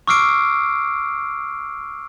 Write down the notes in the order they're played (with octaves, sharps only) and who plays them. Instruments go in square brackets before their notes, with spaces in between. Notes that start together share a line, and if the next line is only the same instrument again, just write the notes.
[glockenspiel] C#6 D6 E6 F6 C7 D7